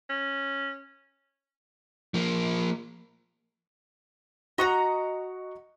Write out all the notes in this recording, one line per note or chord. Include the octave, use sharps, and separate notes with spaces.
C#4
F3 A#3
F#4 D#5 F#5 A#5 C#6